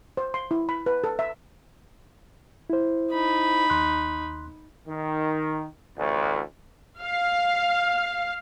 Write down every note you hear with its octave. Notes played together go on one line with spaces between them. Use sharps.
C5
C6
E4
B5
B4
A4
E5
E4 C5
D#4 B5
D#2 C6 F#6
D#3
A1 D2
F5